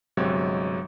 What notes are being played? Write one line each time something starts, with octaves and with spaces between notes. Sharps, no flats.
G1 C3 F#3 G#3 C#5